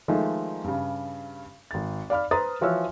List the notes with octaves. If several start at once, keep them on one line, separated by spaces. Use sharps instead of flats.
D#3 F3 G#3 A3 D#4
G2 C#3
G#1 A6
D5 F5 B5 F6
B4 C5 A#5 D#6 A6
E3 F3 F#4 C#5 E6 F6